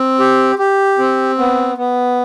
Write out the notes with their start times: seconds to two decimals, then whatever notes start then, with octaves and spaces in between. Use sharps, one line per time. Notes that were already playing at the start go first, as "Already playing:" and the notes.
Already playing: C4
0.19 G4
0.59 G4
0.99 C4
1.39 B3
1.78 B3